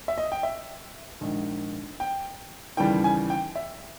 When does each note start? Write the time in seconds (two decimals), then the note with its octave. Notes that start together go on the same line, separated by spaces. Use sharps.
0.08 E5
0.18 D#5
0.32 G5
0.43 E5
1.21 A#1 G#2 D#3 G#3
2.00 G5
2.77 D#2 C#3 E3 G3 G5
3.04 G#5
3.30 G5
3.56 E5